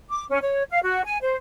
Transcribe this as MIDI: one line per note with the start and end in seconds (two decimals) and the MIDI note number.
0.09 0.24 86
0.28 0.38 61
0.42 0.63 73
0.70 0.80 77
0.83 1.05 66
1.05 1.17 80
1.21 1.35 72